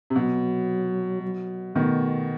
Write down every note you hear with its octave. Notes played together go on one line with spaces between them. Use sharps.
C3
B2 F#3
F#3
B2 D#3 A3